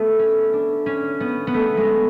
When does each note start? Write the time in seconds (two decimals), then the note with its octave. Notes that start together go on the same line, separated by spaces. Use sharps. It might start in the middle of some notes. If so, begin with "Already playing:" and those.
Already playing: A3 B3
0.19 C#4
0.53 D4
0.86 C#4
1.20 B3
1.47 B3
1.54 A3
1.77 G#3